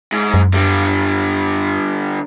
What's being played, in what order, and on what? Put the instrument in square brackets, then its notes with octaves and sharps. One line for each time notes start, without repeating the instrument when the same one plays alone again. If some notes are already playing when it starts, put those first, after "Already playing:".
[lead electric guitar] G#2
[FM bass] F#2
[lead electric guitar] D3 G3